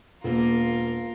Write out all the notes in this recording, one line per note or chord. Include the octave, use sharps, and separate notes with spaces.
E1 A#3 F4 A#4